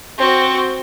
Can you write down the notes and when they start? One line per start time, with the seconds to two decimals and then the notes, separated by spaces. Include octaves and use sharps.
0.18 C4 F#4